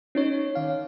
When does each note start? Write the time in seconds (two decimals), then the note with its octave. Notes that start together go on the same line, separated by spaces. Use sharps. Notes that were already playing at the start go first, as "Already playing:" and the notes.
0.15 C#4 D#4 C#5
0.55 D#3 F5